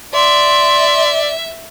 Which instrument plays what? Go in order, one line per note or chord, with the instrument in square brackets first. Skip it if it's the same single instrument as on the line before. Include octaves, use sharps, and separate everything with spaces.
[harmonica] D5 [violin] E5 [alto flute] C6